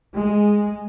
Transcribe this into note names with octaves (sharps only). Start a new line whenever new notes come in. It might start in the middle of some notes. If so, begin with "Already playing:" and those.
G#3